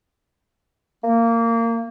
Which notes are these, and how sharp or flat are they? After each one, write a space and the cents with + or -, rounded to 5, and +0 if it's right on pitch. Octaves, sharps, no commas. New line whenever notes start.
A#3 -20